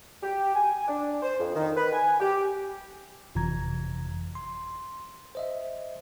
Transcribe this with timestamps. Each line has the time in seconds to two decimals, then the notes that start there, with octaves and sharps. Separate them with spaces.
0.23 G4
0.55 G#5
0.88 D4
1.23 C5
1.40 F2
1.55 D#3
1.77 B4
1.93 G#5
2.21 G4
3.35 G1 F2 C3 E3 A#5 G#6
4.35 C6
5.35 C5 D#5 E5